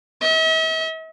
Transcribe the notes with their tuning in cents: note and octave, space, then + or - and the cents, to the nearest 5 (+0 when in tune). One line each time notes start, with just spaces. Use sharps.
E5 -45